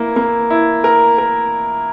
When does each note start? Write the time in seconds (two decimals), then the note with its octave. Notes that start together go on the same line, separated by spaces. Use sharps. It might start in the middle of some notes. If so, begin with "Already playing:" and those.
Already playing: A#3 E4
0.16 A#3
0.50 E4
0.84 A#4
1.18 A#4